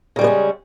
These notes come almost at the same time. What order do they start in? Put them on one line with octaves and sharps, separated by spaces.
C#3 G3 G#3 B3 C#4